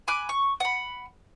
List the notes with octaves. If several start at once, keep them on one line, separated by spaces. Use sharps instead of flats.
G#5 B5 D6 F#6
C#6
F#5 B5